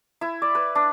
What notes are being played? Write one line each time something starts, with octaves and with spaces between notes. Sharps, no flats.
E4
D5
B4
D4